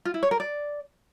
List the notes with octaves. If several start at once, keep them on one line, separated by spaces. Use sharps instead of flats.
F4
E4
C#5
A#4
D5